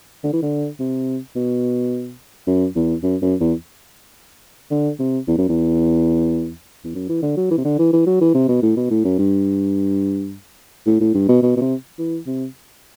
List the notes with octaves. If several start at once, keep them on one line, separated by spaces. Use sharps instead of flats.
D3
E3
D3
C3
B2
F#2
E2
F#2
F#2
E2
D3
C3
E2
F#2
E2
E2
F#2
E3
D3
F#3
E3
C3
D3
E3
E3
F#3
E3
C3
B2
A2
B2
A2
F#2
G2
A2
A2
G2
B2
B2
B2
C3
E3
C3